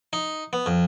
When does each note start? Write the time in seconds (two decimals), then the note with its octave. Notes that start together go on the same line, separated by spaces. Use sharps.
0.13 D#4
0.53 B3
0.66 F2